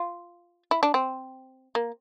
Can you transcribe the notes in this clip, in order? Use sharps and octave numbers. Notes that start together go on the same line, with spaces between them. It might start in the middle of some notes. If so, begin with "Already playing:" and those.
Already playing: F4
E4
D4
C4
A#3